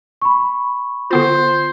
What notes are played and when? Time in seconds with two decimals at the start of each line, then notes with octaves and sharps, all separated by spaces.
0.22 B5 C#6
1.11 D3 B3 F4 C5